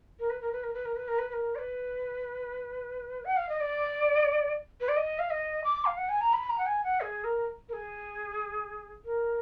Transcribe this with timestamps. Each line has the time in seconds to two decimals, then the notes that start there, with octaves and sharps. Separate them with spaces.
0.19 A#4
0.29 B4
0.41 A#4
0.52 B4
0.63 A#4
0.73 B4
0.85 A#4
0.95 B4
1.07 A#4
1.18 B4
1.29 B4
1.33 A#4
1.55 D5
1.58 B4
3.24 F#5
3.36 F5
3.48 D#5
3.60 D5
4.80 B4
4.88 D5
4.96 D#5
5.18 F5
5.30 D#5
5.64 D6
5.85 F5
5.97 F#5
6.08 G#5
6.20 A#5
6.33 B5
6.49 A#5
6.58 F#5
6.66 G#5
6.84 F#5
7.00 G#4
7.24 A#4
7.68 A#4
7.73 G#4
9.04 A#4